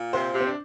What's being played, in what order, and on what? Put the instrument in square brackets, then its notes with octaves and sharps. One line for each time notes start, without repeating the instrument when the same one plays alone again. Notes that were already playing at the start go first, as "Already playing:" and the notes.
Already playing: [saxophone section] A#2
[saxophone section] C3 [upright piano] C5
[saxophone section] C3
[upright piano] C4
D4